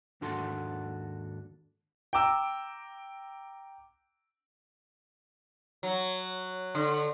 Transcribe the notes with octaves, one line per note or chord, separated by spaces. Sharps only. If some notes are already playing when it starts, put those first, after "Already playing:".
D#2 G#2 D4 F#4 A4 C6
G5 A#5 D6 E6
F#3
D3